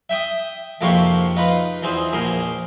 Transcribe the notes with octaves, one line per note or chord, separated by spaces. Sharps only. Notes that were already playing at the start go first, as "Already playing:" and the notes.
E5 G5 D#6
F2 G#2 C3 A#3 C6 C#6
D#4 F4 B4
E2 C4 G#4 C5
A#1 G#4 A#4 C6